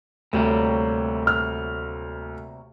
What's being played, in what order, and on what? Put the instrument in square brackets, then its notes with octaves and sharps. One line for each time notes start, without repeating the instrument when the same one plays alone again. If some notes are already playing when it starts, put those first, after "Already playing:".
[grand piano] D2 [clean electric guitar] C3 G3 A#3 [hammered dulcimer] A3 C#5 F5
[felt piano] F6